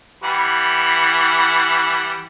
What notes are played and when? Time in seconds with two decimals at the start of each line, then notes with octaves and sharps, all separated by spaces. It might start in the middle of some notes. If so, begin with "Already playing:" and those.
0.24 E3 G3 F#5